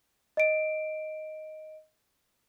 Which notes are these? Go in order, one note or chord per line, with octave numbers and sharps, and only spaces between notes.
D#5 D7